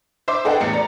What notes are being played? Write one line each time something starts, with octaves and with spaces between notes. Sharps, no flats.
C5 E5 C6 D6
G#4 A4 B4 D#5 F#5 G5
A1 E2 C#7
D5 A#5